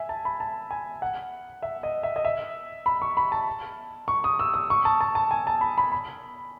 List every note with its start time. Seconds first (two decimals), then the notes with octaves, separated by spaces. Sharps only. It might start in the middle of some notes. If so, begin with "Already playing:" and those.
Already playing: E5 G#5
0.09 A5
0.25 B5
0.40 A5
0.71 G#5
1.02 F#5
1.62 E5
1.83 D#5
2.03 E5
2.16 D#5
2.25 E5
2.86 B5
3.02 C#6
3.17 B5
3.32 A5
4.08 C#6
4.24 D#6
4.39 E6
4.54 D#6
4.70 C#6
4.85 A5
5.01 A5
5.15 A5
5.31 G#5
5.47 A5
5.61 B5
5.78 B5
5.92 B5